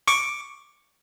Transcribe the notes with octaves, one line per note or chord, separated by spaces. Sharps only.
C#6 D6